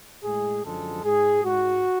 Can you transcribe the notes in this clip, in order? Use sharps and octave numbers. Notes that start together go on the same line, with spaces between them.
A2 G#3 G#4
F#2 D3 F3 G#3 A4
G#2 G#3 G#4
G#2 G#3 F#4